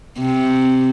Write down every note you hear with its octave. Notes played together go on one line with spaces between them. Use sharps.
C3